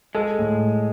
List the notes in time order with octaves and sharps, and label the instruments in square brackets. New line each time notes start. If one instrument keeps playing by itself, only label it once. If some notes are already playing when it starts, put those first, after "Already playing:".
[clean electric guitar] G#3 [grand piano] A4
[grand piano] A2